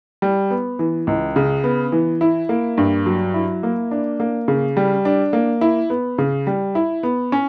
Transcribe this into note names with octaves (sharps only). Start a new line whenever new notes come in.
G3
B3
E3
C#2
C#3
B3
E3
E4
A#3
G2
F#3
E4
A#3
D4
A#3
C#3
G3
D4
A#3
E4
B3
C#3
G3
E4
B3
C#4